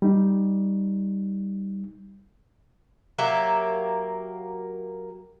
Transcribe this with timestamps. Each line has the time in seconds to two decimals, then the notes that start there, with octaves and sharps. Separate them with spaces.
0.02 G3 D#4
3.18 F#3 A#3 G4 E5